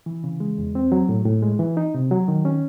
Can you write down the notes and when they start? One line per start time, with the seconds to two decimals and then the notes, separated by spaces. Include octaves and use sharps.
0.06 E3
0.24 C#3
0.40 G#3
0.58 E2
0.75 C4
0.92 F#3
1.09 A2
1.25 A2
1.43 G#3
1.59 E3
1.77 D#4
1.95 C3
2.11 F#3
2.28 D#3
2.45 C#4